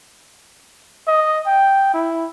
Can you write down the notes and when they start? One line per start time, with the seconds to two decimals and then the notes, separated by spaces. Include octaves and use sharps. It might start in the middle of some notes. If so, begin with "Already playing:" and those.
1.07 D#5
1.46 G5
1.94 E4